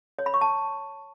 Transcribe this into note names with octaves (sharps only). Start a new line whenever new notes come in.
C#5
B5
C#6
A5